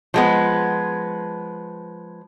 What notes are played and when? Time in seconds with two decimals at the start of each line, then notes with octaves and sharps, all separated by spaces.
0.14 F3 G#3 B3